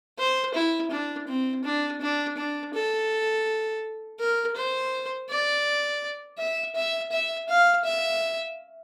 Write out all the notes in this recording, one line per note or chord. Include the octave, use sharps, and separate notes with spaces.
C5
E4
D4
C4
D4
D4
D4
A4
A#4
C5
D5
E5
E5
E5
F5
E5